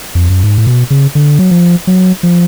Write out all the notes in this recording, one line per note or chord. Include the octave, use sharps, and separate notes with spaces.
F2
F#2
G#2
A2
B2
C#3
D3
F#3
F3
F#3
F3